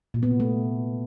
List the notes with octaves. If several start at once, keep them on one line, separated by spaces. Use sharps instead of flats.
A#2
B3
C3
A3